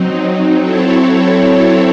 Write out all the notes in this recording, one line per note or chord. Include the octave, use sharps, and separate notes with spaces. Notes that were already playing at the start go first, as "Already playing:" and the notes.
Already playing: F#3 C4 D#4
F#3 C4 E4 A4 C#5